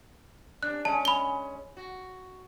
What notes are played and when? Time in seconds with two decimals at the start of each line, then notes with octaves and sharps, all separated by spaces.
0.63 C3 D4 F#6
0.85 G#3 C#4 A5
1.05 B5 G7
1.77 F#4